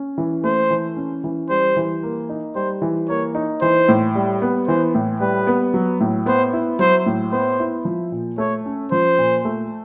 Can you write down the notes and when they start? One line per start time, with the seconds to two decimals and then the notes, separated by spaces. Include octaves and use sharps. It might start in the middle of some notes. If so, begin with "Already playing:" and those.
Already playing: C#4
0.18 E3
0.43 A3 C5
0.70 E3
0.96 C#4
1.24 E3
1.49 G3 C5
1.77 E3
2.03 A#3
2.29 D#4
2.55 G3 C5
2.82 E3
3.09 A#3 C#5
3.35 D#4
3.61 E3 C5
3.89 A2
4.15 G3
4.42 B3
4.67 E3 C5
4.95 A2
5.20 G3 B4
5.47 B3
5.74 F#3
6.00 A2
6.26 B3 C5
6.53 E4
6.79 F#3 C5
7.06 A2
7.32 B3 C5
7.60 E4
7.85 F3
8.12 A#2
8.38 A3 C#5
8.66 C#4
8.92 F3 C5
9.18 A#2
9.45 A3